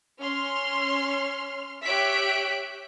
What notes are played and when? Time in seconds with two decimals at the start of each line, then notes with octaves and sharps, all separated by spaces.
0.21 C#4 C6 F6
1.86 G4 C#5 E5 F#6 B6 D7